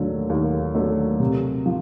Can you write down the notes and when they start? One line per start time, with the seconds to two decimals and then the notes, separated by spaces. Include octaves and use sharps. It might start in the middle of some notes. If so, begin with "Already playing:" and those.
Already playing: D#2 D3 F#3 A3
0.30 D#2
0.75 D3 F#3 A3
1.20 C3
1.66 F3